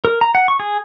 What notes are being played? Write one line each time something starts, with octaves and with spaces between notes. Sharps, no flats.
A#4
A#5
F#5
C#6
G#4